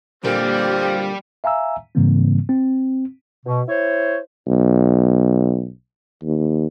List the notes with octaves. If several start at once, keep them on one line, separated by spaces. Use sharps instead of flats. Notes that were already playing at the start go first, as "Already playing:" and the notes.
A#2 D3 G3 A#3 C4 F4 G4
E5 F5 G#5 A#5 E6
G#2 C#3 E3 G3 A#3 C4
C4
B2
E4 C5 C#5
B1
D#2